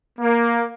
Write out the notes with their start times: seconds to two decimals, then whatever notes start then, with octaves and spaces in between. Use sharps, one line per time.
0.19 A#3